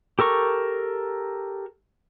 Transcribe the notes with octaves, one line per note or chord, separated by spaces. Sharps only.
G4 A4 A#4 C#6